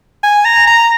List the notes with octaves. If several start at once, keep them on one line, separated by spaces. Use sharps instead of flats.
G#5
A#5
A#5